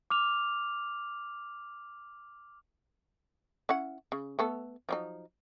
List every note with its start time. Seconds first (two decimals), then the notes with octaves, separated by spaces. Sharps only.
0.10 D6 F6 F7
3.69 C#4 E4 F#5
4.12 C#3
4.39 A3 B3 A4
4.89 F3 F#3 D#4